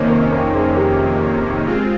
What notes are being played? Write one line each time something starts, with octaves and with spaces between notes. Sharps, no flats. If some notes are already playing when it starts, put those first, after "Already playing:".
Already playing: F2 C3 D#3 A#3 C#4 C5 D#5
A#4 C#5
A#4 C#5
G#4 C5
G4 A#4
G#3 C4 F4